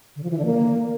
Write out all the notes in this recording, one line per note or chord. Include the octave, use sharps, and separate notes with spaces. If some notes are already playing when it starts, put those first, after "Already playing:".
D3
F3
E3
D3
A#3